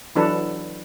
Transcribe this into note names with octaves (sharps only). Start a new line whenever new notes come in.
E3 F#3 D4 A4 B4